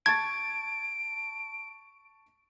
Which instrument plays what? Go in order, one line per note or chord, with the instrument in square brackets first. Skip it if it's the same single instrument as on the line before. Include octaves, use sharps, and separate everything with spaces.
[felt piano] A5 C#6 A6 [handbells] G#6 [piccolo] D7